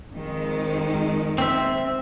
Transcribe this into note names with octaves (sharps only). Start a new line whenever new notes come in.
F2 D#3 G#3
C4 E5